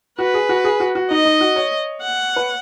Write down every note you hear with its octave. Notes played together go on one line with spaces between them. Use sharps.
F#4 B4
G#4
F#4
G#4
F#4
F#4
D#4 D#5
D#4
F#4
C#5
F#5
B4